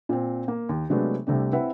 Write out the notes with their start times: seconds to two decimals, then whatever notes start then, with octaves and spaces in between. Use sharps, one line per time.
0.09 A#2 C4
0.48 A#3
0.69 D#2
0.90 C3 F#3 G#3 A3 B3 D4
1.27 C2 C3 A3 D4
1.53 C4 E4 B4 E5 F#5